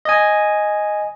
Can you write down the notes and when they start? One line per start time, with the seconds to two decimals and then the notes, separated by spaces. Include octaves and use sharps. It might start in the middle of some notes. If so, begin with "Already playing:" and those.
0.05 D#5 G#5